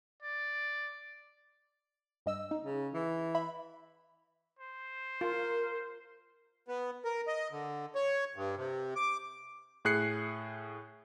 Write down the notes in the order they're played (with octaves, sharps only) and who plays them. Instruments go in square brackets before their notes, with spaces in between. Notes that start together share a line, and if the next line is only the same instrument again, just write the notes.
[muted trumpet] D5
[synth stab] G2 D#5 E6
D#4
[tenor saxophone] C#3
E3
[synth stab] E5 B5
[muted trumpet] C5
[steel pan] F4 [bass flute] A#4
[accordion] B3
A#4
D#5
D3
C#5
G2
C3
D6
[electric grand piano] A2 G#4 F#6 C7 C#7